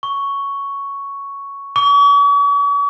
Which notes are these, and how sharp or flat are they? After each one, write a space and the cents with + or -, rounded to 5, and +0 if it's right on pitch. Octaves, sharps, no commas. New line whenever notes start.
C#6 +5
C#6 +45